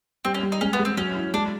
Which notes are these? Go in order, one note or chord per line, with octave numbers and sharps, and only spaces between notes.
G3 C4
C#4
G3
D#4
G#3 C#4
B3
G#3
C4
F#3 C#4
E4
G#3 D4